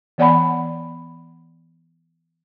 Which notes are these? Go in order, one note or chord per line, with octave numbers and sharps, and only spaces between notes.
E3 B3 D5 F#5 G#5 B5